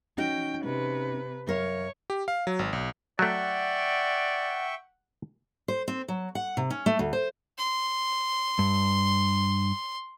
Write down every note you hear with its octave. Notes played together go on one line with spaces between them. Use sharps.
C#4 D#4 F#4 G5
C3 B4
F#2 A#4 C#5 F5
G4
F5
F#3
G#1
B1
F#3 A3 D5 E5 F#5 G5 C#6
C5
C4
F#3
F#5
C3
C#4
A3
D2
C5
C6
G2